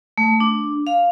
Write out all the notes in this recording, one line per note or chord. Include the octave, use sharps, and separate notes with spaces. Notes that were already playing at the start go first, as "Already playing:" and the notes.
A3
D4
F5